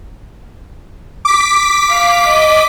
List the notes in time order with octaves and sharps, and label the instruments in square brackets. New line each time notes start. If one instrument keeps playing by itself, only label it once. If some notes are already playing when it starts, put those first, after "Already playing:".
[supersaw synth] D6 B6
[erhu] F5
D#5